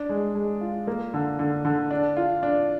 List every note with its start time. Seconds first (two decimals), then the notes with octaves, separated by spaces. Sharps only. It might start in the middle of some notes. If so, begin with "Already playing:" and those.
Already playing: D4
0.09 G#3
0.35 G#3
0.61 F4
0.87 A#3
1.14 D3
1.39 D3
1.65 D3
1.91 D4
2.17 F4
2.43 D4